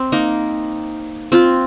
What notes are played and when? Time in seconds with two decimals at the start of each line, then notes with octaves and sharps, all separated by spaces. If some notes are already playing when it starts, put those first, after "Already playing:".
Already playing: C4
0.12 A#3 D#4
1.32 C4 F4